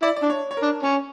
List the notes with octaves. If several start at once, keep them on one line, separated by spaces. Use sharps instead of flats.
E4 D5
D5
D4
C#5
C#5
A#4
D4
C#4 C#5